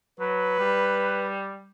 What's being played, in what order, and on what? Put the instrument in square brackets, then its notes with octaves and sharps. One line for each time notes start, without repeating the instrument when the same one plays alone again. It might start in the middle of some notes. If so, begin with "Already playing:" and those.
[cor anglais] F#3 [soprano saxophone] B4
[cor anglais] G3